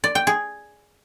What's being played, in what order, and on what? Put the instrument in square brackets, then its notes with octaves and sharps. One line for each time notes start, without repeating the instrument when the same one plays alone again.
[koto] D5
G5
G#4